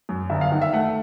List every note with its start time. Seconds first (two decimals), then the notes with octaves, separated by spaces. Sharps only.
0.09 F#2
0.30 G1 E5
0.41 F5
0.51 D#3 F#5
0.62 E5
0.73 A3 F#5